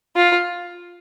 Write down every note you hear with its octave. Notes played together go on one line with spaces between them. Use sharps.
F4